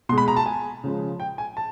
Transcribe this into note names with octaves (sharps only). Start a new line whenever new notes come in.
B2 G#3 C6
B5
A#5
A5
G#5
C#3 F3 G#3
G5
G#5
A5